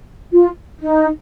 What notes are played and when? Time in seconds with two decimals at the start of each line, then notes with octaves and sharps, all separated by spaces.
0.32 F4
0.79 D#4